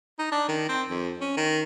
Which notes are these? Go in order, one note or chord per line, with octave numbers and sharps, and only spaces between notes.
D#4
D4
D#3
C4
F2
C#4
D#3